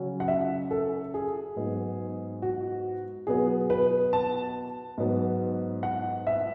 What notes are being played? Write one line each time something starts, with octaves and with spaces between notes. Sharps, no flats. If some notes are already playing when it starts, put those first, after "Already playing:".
Already playing: C#3 F#3 C#4
F#5
E5
A4
G#4
G#2 F#3 B3
F#4
B2 F#3 B3 G#4
B4
A5
G#2 F#3 B3
F#5
E5